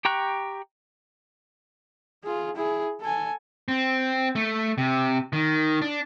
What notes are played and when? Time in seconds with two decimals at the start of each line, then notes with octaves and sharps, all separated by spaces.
0.05 G4 G5 A#5 C#6 F#6
2.24 F4 G#4
2.56 E4 G#4
3.00 A4 G#5
3.68 C4
4.35 A3
4.78 C3
5.33 D#3
5.82 D4